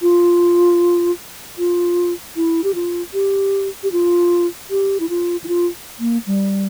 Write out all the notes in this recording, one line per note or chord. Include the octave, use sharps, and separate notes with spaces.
F4
F4
E4
G4
F4
G4
G4
F4
G4
E4
F4
E4
F4
A#3
G3